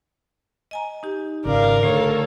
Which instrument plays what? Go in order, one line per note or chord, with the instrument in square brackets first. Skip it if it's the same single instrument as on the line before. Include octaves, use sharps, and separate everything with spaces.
[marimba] D#5 G#5 A#5
D#4 G4
[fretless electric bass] G#1 C#3 [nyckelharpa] A#4 [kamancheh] D5 F5
[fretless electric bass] D3 [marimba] A3 [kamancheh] A4 C#5